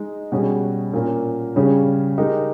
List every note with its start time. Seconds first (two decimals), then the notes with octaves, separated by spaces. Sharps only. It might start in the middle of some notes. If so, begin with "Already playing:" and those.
Already playing: G#3 D#4 G#4
0.32 B2 G3 C#4 G#4
0.93 A#2 A#3 C#4
1.56 C#3 G3 C#4 G#4
2.18 G#3 D#4 G4 A#4